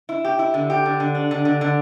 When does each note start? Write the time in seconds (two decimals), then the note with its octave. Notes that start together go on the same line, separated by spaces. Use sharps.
0.09 E4
0.25 G4
0.39 E4
0.54 D3
0.70 G4
0.86 D3
1.00 D3
1.15 D4
1.31 D3
1.45 D3
1.61 D3